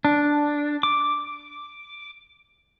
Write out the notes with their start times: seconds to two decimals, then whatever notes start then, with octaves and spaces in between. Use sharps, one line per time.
0.05 D4
0.83 D6